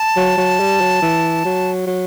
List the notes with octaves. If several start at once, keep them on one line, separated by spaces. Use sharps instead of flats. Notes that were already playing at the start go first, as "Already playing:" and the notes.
Already playing: A5
F#3
F#3
G3
F#3
E3
F#3
F#3